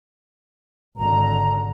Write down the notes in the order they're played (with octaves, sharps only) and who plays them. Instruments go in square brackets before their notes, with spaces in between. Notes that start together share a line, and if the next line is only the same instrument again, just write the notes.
[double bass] G#1 D3 [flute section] A#5